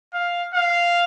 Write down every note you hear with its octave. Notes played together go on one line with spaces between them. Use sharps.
F5
F5